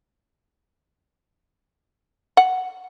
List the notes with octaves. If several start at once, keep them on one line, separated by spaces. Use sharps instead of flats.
F#5